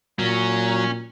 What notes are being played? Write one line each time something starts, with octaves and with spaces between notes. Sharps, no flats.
A#2 F#3 C#4